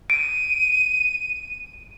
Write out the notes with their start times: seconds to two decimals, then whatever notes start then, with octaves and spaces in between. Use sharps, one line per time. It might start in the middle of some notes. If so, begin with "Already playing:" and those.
0.10 D7 D#7